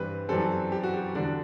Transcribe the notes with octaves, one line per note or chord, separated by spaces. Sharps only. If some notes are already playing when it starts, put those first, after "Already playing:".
Already playing: G2 E3 G3 C4 B4
F#2 E3 G3 C4 A4
G4
F#4
G4
E2 D3 G3 D4 F#4